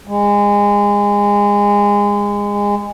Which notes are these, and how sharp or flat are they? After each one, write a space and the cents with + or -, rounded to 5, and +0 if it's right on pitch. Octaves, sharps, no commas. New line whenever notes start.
G#3 -25